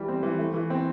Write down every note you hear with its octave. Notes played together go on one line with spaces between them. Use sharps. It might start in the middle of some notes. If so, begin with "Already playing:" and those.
Already playing: E3 G3
C4
E3
A3
E3
C4